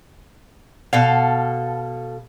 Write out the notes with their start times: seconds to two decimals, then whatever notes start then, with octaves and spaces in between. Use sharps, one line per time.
0.93 B2 A4 F5